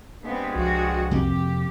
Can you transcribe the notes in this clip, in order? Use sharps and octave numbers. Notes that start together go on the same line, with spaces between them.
G2 G#3 B3 C4
C2 F3 F#4
F2 C3 A#3 G4